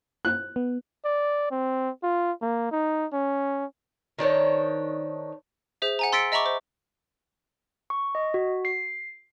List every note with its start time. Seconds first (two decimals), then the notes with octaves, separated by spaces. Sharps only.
0.25 F#6
0.56 B3
1.05 D5
1.51 C4
2.03 F4
2.42 A#3
2.71 D#4
3.13 C#4
4.19 D#3 D4 C5 C#5
5.82 G#4 C5 E5
5.99 F#5 G#5 A#5
6.12 C6 E6 A6 B6 C#7 D7
6.32 D#5 E5 A#5 B5 C#6 D6
6.46 C5
7.90 C#6
8.15 D#5
8.34 F#4
8.65 C7